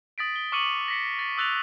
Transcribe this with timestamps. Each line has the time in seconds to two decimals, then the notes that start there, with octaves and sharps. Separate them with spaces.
0.18 D#6 A6 B6 D7
0.36 G7
0.52 C#6 D6 F6 C#7 D#7 F#7
0.88 A#6 B6 C#7
1.19 A6 B6
1.37 D#6 E6 F#6 A6 B6 F7